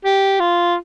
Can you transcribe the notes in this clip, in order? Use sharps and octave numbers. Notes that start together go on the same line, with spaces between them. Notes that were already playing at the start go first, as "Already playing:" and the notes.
G4
F4